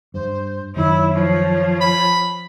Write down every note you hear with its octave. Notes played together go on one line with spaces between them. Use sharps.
G2 C5
F#2 D#3 E4 C#5
F3 C#5
B5